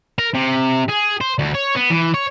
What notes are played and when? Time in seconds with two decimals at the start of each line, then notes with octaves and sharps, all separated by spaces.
0.18 A#4
0.34 C3
0.89 G#4
1.21 C5
1.38 D2
1.54 C#5
1.75 B3
1.90 E3
2.14 C#5